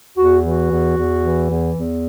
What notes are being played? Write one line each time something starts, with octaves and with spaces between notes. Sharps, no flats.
E2 F#4
E3 F#4
E2
E2
E3
E2
E2